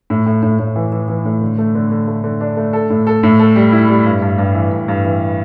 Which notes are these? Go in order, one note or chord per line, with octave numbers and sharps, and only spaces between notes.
A2
A2
A2
A2
E3
E3
E3
A2
D3
A3
D3
D3
A3
D3
D4
A3
A4
A2
A4
A2
A4
G3
E4
G3
G2
G2
G2
E3
G2
G2
E3